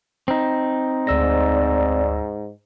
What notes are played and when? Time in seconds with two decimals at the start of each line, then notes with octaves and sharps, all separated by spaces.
0.28 C4 D#4
1.07 D2 G#2 D5 E6 A#6